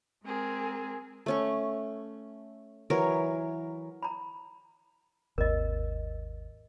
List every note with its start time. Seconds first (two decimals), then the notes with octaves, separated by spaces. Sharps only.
0.24 G#3 C4 G#4 A#4
1.26 A3 C#4 C#6
2.90 E3 F#3 A#4 C#5
4.03 A#5 B5
5.38 G#1 D#2 A#4 D#5